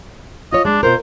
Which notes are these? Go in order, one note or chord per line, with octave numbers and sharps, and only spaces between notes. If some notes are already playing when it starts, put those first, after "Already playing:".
F4 C#5 D#5
G#3 D4
B2 F4 A#4 C5